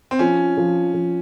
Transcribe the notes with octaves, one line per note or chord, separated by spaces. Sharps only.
C4
F3 C#4
F3
F3